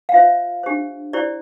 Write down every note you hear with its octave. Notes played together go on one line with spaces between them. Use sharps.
F5
F4 C5 E5
D4 G4 C5
E4 G4 C5 D5